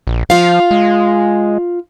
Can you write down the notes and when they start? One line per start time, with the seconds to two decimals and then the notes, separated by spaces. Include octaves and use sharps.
0.07 A#1
0.30 F3 F4 F5
0.71 G#3